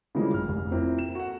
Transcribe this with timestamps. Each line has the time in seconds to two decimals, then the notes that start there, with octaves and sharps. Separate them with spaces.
0.15 C#3 E3 F3 G3 G#3 A#3
0.34 A1 F6
0.48 F1
0.71 A#3 C4 E4 F4
0.99 E7
1.15 F#4 A4 F#5